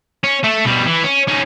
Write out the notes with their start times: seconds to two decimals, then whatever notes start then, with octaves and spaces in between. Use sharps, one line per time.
0.24 C#4
0.44 A3 A4
0.65 B2 G3
0.87 E3
1.03 C#4
1.28 C#4 D#4